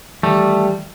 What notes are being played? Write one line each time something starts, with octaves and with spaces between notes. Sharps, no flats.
D#3 E3 G3 A3